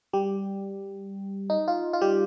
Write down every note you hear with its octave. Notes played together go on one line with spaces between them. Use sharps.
G3 G4
D#4
F4
F4
G3 G4